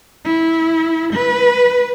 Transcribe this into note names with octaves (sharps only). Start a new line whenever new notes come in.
E4
B4